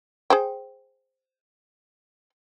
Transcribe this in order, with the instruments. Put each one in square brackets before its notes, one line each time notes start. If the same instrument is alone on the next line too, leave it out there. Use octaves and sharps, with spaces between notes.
[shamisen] G#4 C5 G5